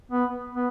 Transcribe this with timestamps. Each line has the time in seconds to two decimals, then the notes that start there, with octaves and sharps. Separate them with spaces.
0.12 B3
0.55 B3